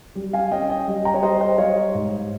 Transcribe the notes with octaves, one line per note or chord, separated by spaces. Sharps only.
G3
F5 G#5
C#4 D#5 G5
D#5 G5
G3
G5 A#5
C#5
G3 C5 D#5
C5 D#5
G3 C#5 F5
G#2